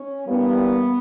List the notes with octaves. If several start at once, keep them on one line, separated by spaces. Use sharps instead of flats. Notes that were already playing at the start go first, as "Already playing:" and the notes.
Already playing: C#4
G2 E3 G3 A#3 B3